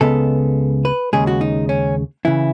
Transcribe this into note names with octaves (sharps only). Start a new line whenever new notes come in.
C#2 C#3 G#3 B3 A4
B4
D#2 C#3 G#3 G#4
F#4
D#4
C#4
C#3 E3 E4